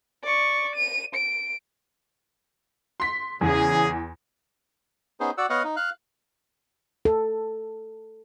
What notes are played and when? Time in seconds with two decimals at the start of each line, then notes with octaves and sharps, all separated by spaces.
0.24 D5 C#6
0.76 D#7
1.15 D7
3.00 C6 B6
3.41 E2 C#3 G#4
5.20 B3 C#4 D#4 G#4 C5
5.38 F#4 D5 F#5 E6
5.50 B3 C#5 D#5 F5 F#5
5.64 D#4
5.76 F5 F#6
7.05 A4